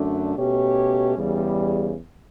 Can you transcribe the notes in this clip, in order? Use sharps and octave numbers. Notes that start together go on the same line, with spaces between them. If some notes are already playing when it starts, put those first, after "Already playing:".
Already playing: F#2 D3 A3 D4
B2 A3 C#4 G4 C#5
E2 C#3 G3